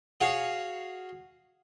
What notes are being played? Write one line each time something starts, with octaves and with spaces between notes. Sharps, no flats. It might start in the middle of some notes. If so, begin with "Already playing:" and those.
F#4 G#4 C#5 F5